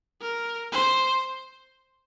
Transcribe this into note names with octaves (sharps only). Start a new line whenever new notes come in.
A#4
C5